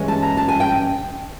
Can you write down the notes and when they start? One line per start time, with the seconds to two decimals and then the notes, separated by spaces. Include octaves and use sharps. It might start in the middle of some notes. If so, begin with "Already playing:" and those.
Already playing: G2 E3 G#3 C#4
0.08 A5
0.22 A#5
0.37 A5
0.49 G#5
0.60 G5